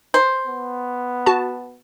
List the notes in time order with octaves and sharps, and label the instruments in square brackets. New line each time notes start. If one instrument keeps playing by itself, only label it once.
[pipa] C5
[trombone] B3
[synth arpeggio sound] F#4 A5